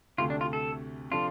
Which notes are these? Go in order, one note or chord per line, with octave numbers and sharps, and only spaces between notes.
D2 C3 A3 F4
D4
F4
A4
C3 F3 D4 F4 A4